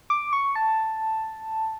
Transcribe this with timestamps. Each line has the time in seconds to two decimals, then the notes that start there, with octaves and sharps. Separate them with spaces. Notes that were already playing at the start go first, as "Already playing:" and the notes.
0.10 D6
0.33 C#6
0.56 A5